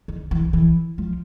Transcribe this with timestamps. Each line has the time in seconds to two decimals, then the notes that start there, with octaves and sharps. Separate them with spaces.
0.08 D#3
0.31 E3
0.53 E3
0.98 F3